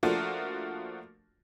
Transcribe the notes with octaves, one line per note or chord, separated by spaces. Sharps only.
F3 A3 A#3 D4 F4 F#4